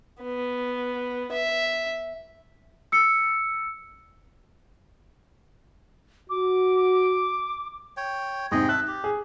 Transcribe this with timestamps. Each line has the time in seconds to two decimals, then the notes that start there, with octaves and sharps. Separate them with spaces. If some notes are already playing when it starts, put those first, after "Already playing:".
0.22 B3
1.32 E5
2.92 E6 C#7
6.30 F#4 D6
7.97 C#5 G5
8.52 G#2 C3 G#4 D#5 G5
8.69 E5 A5 F#6
8.87 G4
9.04 G#4